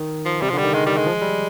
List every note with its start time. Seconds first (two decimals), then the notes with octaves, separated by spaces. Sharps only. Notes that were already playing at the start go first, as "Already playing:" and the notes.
Already playing: D#3
0.26 F3
0.42 C3 G3
0.49 F3
0.53 D3
0.58 G3
0.63 D#3
0.74 D#3 G#3
0.86 G3
0.97 G#3
1.06 F3
1.21 G3